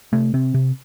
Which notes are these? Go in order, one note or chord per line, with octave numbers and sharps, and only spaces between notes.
C3 A3
C3 C4
C3